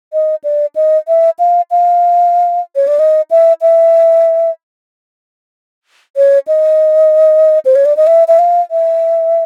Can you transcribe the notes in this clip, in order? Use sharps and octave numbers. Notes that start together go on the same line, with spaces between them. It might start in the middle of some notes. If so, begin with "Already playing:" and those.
D#5
D5
D#5
E5
F5
F5
C#5
D5
D#5
E5
E5
C#5
D#5
C5
C#5
D5
D#5
E5
E5
F5
E5